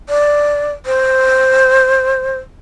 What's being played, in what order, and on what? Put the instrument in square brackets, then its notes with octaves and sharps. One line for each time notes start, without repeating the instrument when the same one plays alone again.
[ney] D5
C5